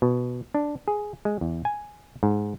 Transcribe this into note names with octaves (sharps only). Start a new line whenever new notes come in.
B2
D4
G#4
G#3
E2
G#5
G#2